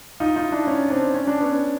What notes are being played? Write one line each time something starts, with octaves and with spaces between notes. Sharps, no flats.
D#4 F4
D#4 F4
D4 E4
C#4 D#4
C4 D4
C#4
D4
B3 C#4